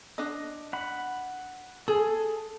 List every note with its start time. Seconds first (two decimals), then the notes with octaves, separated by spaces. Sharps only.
0.18 D4 D#5
0.73 F#5 B5
1.88 G#4 A4